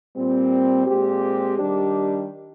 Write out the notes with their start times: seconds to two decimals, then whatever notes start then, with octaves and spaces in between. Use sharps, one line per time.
0.15 A#2 G3 C4
0.86 A#2 G#3 C4 G4
1.58 D#3 G3 D4 G4